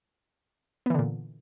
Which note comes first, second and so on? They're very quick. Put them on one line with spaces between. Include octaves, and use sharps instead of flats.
B3 E3 D3 A#2